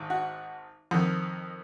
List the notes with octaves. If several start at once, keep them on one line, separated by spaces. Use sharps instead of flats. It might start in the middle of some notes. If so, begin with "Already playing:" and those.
Already playing: G#1 G#2
F#4
F2 D#3